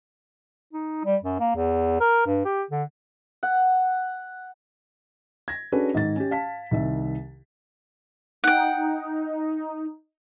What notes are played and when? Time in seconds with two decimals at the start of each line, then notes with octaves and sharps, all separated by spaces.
0.73 D#4
1.05 G3
1.23 F#2
1.40 A#3
1.55 E2
2.00 A#4
2.26 G2
2.45 G4
2.71 D3
3.43 F#5
5.48 G#6 A#6
5.72 C#4 D4 F#4 G#4 A4 B4
5.94 G#2 D#3 A6
6.16 C#4 G4
6.31 F5 A5 B6
6.71 C2 D#3 E5
8.44 D#4 F#5 G5